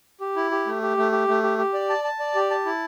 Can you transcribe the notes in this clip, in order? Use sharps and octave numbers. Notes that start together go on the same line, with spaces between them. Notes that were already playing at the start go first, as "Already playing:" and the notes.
G4
E4
G4
A3
G4
A3
G4
A3
G4
G4
D5
A5
A5
D5
G4
A5
E4